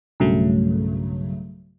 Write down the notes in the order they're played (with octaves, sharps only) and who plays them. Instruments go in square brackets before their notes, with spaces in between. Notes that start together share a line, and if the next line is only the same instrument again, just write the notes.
[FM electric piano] B1 G2 C#3 F#3 A3